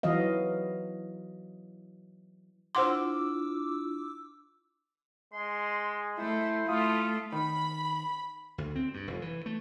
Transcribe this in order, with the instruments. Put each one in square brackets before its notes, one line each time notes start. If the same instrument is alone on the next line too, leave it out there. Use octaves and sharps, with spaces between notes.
[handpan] E3 F#3 F#4 D#5 F5
[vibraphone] D4 E4 F4 [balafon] C5 F#5 C6 [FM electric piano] D6 E6
[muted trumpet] G#3 [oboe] C6
[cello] A3 [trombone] E4 [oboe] C5
[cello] A3 [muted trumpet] F4 [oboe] D#6
[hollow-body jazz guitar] D#3 [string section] B5
[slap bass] D2
C4
G2
F1
E3
A3